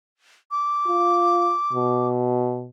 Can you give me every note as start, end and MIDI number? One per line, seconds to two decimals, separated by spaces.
0.51 2.08 86
0.88 1.55 65
1.73 2.68 47